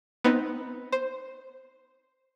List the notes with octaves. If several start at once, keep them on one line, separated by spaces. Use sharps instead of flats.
B3 C4 D#4
C5